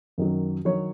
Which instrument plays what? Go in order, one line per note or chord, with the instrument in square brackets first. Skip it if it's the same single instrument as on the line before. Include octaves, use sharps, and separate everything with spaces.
[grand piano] F#2 D#3 F#3
D#3 F#3 C#5